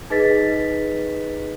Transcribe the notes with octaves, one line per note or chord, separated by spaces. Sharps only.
D#4 G#4 B4 D#5 A6 B6